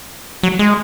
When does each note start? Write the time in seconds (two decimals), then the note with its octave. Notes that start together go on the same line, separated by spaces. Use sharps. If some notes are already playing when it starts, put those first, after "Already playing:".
0.43 F#3
0.59 G#3